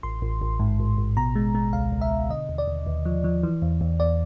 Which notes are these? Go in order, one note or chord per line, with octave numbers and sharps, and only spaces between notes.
A1 C6
A1
A1
G#2
A1
A1
B2 A#5
G#3
G#3
C#2 F5
C#2
E5
B2
D3 D#5
D#2
D5
D#2
D#2
F3
F3
E3
E2
E2
E2 D5